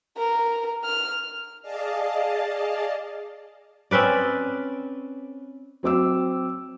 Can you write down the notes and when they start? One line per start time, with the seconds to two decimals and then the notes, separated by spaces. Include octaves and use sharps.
0.17 A#4
0.84 F6
1.62 G#4 D5 D#5 F5 A5
3.91 C4 C#4 B4 D5
5.83 F#3 C4 D6 E6